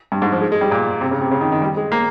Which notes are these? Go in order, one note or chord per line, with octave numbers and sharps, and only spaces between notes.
G2
G#2
F3
G#3
G#3
G3
A#2
C3
C#3
C3
C#3
D#3
D#3
G3
G#3
A#3